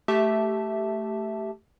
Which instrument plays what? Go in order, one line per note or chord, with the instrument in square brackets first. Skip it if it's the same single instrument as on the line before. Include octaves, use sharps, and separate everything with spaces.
[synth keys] A3 G4 E5 A5